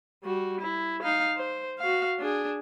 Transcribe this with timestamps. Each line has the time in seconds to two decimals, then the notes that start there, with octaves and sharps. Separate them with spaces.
0.24 G3 F#4
0.61 E4
1.03 D#4 F5
1.37 C5
1.79 F#4 F5
2.20 D4 G#4